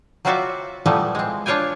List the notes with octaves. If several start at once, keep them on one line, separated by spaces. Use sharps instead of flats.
F#3 C4 F4 F#4 D5 E5
A#2 E3 F3 G3 A3 B3
G#3 C4
D4 F4 C#5 F5 G5 G#5